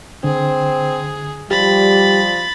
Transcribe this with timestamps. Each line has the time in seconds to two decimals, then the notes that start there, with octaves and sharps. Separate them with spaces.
0.24 D3 C4 G#4
1.51 F3 G3 G4 B5 A6